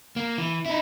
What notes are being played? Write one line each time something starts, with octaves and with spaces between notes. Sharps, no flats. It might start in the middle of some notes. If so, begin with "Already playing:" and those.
A#3
E3
D#4 E4